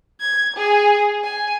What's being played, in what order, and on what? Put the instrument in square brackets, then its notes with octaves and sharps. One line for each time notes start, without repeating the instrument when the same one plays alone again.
[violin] G#6
G#4
G#5